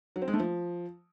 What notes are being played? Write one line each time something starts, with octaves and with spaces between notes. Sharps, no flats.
F#3
C4
G#3
A3
F3